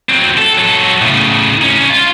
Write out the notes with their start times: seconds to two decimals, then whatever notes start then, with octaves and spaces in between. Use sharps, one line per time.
0.09 F#3 C4
0.37 A4
0.57 F#3 A4
1.01 A2 C#3
1.61 C#4 D#4
1.90 F4